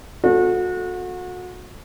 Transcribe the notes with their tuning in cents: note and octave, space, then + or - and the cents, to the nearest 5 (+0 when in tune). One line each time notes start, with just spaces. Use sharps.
B3 +45 F#4 -30 A4 +0